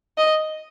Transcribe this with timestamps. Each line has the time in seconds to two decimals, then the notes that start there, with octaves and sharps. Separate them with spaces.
0.18 D#5